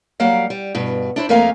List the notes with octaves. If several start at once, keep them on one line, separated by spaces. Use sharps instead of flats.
F#3 G3 A#3 F5 F#5
G3
G2 B2
D4 E4 C5
F2 A3 A#3 A#4 F5 G#5